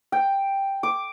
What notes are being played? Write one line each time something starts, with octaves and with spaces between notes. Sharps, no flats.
G5
D6